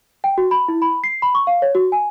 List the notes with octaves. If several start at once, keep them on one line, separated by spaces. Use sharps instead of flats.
G5
F#4
B5
E4
B5
C7
B5
C#6
F5
C#5
F#4
G#5